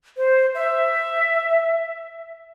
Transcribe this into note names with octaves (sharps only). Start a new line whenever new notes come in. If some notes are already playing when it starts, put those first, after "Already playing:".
C5
E5